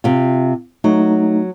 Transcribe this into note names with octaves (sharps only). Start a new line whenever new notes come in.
C3 F4
F#3 A3 D#4